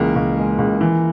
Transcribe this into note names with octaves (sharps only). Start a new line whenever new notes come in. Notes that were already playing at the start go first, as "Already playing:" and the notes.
Already playing: C#2 E3 A#3 A#4
C#2
G#3
C#2
E3